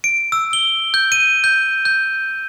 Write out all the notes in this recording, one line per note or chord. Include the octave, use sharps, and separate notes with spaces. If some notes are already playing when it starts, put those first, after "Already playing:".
D7
E6
G7
G6
D#7
G6
G6